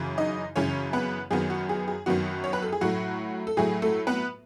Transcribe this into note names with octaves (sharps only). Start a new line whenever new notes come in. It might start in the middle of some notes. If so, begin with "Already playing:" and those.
Already playing: F#2 C#3 E3
D#4 D#5
F#2 C#3 E3 C#4 C#5
B3 B4
F#2 D#3 F#3 B3 G#4
F#4
G#4
G#4
F#2 D#3 F#3 B3 F#4
C#5
B4
A4
G#4
A2 F#3 A3 F#4
A4
A2 F#3 A3 G#4
A3 A4
B3 B4